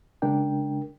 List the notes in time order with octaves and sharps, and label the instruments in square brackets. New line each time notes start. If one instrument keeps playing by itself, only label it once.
[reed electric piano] C#3 G#3 D4 A#4 G5